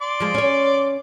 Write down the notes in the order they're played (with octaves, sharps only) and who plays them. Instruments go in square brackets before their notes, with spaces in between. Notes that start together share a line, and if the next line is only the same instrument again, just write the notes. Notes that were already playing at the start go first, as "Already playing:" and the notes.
[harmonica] D5 C6 D6
[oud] F3 G#3
C#4 C#5